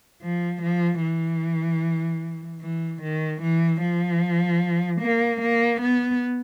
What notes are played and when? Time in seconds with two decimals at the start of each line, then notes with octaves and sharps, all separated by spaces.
0.22 F3
0.62 F3
1.02 E3
2.61 E3
3.02 D#3
3.42 E3
3.81 F3
5.01 A#3
5.41 A#3
5.81 B3